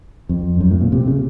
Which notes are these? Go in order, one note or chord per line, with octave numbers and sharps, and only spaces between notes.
F2
F#2
A2
A#2
C3
C#3